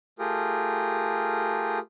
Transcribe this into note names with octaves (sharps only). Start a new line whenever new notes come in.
A3 F4 G4 G#4 A#4